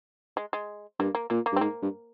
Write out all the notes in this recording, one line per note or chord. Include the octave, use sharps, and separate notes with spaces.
G#3
G#3
G2 A#3
A#3
A#2 A#3
A#3
G2
C4
G#2 A#3
G2